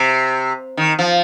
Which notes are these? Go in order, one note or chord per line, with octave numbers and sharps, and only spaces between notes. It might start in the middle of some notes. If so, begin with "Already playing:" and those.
Already playing: C3
D#3
F3